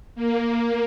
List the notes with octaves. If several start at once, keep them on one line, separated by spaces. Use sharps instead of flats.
A#3